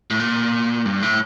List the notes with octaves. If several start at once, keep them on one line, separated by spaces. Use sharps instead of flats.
A2
A#2
G2
A2